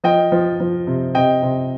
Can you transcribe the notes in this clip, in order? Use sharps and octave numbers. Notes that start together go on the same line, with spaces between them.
F3 D#5 G5
F3
F3
C3
C3 D#5 G5
C3